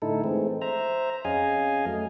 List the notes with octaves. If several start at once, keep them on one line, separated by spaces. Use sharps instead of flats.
A2 D3 D#4 E4 A4
E3 G#3 A3 C4
C5 E5 A#5
F2 C#4 G#4 D#5 F5 G#5
F#3 A3